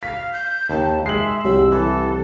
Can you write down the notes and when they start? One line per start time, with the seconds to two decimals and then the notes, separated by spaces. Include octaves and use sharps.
0.03 F5 B6
0.33 G6
0.69 D#2 A5
1.06 G#3 E5 C7 F#7
1.44 C2 G4 C#5 E6
1.72 E3 A4